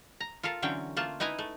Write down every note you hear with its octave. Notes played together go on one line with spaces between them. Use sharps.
A#5
F4 A4 A#4 F5
D3 E3 F#3 C4 C#4 G5
A3 A#3 F4 A5
D#4 E4 B4 G#5 A#5
A3